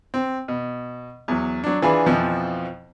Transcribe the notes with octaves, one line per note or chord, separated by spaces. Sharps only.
C4
B2
E2 F#3
F#3 D4
E3 D4 F4 G#4 B4
F2 B2 E3 F3